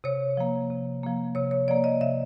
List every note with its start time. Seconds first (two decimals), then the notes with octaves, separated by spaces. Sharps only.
0.04 C3 C#5
0.37 F3 A#3
0.70 C3
1.03 F3 A#3
1.35 C3 C#5
1.51 C#5
1.68 F3 A#3 D5
1.84 D#5
2.01 C3 E5